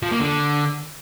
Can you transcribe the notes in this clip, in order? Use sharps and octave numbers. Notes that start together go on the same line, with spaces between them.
F3
A#3
D3